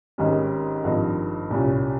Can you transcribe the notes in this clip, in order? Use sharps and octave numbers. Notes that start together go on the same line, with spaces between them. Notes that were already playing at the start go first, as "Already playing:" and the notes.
G#1 G#2 D#3 G3 C#4
G#1 G2 F3 C4 D#4
C2 A#2 G3 C#4